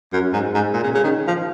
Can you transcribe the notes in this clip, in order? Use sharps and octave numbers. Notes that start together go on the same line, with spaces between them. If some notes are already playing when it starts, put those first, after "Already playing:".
F#2
G#2
G#2
A#2
C#3
C#3
D#3
F3